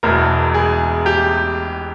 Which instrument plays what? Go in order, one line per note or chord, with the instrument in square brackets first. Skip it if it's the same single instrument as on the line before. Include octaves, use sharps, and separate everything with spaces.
[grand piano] E1 E2 B2 A#4
G#4
G4